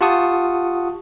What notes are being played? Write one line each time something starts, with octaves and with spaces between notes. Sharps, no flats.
F4 G4 F#5 A5 C#6 D#6